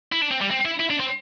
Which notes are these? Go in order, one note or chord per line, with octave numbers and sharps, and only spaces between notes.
E4
D4
C4
G3
C4
E4
E4
D4
C4